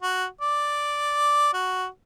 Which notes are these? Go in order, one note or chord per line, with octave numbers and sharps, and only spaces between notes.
F#4
D5
F#4